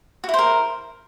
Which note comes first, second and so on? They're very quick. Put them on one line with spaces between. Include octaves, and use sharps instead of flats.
F#4 E4 C5 A#4